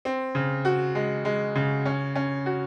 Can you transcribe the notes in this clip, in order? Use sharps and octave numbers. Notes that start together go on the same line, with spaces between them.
C4
C#3
F#4
G#3
G#3
C#3
C#4
C#4
F#4